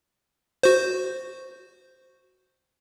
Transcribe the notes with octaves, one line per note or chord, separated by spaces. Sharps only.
F#4 C5